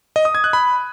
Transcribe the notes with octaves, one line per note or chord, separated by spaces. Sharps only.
D#5
D#6
G#6
F#6
B5